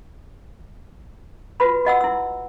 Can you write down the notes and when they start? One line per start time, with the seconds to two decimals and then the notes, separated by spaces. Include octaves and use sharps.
1.60 F4 F#4 B4 B5
1.85 F#4 D#5 F#5 E6
2.01 E4 E6